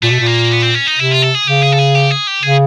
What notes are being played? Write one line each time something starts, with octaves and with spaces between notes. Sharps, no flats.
A#2 A3
B2
A#2
A#3
B3
C4
C#4
D#4
C3 E4
F4
A4
G#4
C#3 G4
G#4
A4
G#4
G4
G#4
G4
C#3 G#4